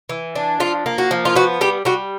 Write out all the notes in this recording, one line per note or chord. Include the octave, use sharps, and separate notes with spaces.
E3
D4
F3 F4
A#3
F#4
F3
F4
B3 F#4
G3 G4
G3 F#4